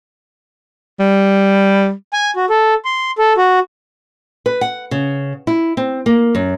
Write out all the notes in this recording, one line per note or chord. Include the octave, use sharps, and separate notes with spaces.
G3
G#5
F#4
A4
C6
A4
F#4
B4
F#5
C#3
E4
C4
A#3
F#2